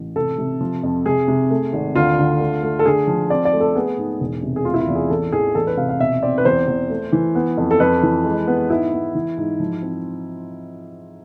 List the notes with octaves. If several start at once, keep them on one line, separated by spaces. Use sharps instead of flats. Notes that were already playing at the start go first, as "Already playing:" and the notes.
Already playing: A1
C3 A4
C3
F3
F2
C3 G#4
C3
A3
G#1
D2 F4
D3
A3
A3
A4
D3 G#4
F3
C4 D5
D5
A3
A4
B3 G#4
G#2
E1
C3
G#4
A3 F4
E4
F4
E2
G#4
A1 A4
A1 G#4
E2 A4
B4
C3 F5
F5
B2 E5
C4 D5
B4
E2 C5
E2
A3
E3
B3
F2
A4
F2 B4
E3
G#3
B3
G#2 E4
B3
E3
G#2
F3
C4